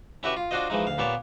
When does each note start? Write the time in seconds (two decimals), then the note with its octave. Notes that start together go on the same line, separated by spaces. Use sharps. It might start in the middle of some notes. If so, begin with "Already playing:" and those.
0.23 C#4 E4 F#4 G4 B4 E5
0.37 F4
0.51 D4 F4 F#4 C5 D#5
0.70 E3 F3 G#3 D#4
0.87 D2 F5
0.98 A#2 B3 G4 C#5 A5